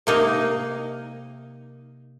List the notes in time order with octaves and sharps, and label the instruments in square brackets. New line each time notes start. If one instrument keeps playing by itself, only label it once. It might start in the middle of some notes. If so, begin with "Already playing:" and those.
[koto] C3 A#3 D#4